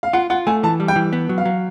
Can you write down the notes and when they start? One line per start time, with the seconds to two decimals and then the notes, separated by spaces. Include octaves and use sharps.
0.03 F5
0.13 F4 F#5
0.30 F4 F#5
0.47 A3 G#5
0.63 E3 A5
0.80 G3
0.88 G5
0.96 E3
1.13 B3
1.29 F#3
1.38 F5
1.45 F#3